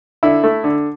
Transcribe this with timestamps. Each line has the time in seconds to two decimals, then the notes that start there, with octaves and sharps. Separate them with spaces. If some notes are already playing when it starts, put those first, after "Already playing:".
0.23 D3 E4
0.44 A3
0.64 D3